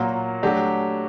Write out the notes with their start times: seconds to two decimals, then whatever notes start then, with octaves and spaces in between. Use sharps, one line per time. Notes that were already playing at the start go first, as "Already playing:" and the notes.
Already playing: A#2 F#3 A#3
0.43 F#3 A3 D4 G4